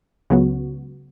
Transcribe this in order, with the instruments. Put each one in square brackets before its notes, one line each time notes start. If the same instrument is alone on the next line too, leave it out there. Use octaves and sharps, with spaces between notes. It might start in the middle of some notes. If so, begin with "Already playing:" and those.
[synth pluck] C#2 C#3 F#3 B3 F#4